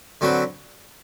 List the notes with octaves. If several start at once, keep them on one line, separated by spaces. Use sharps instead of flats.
D3 F#3 C4 F#4 B4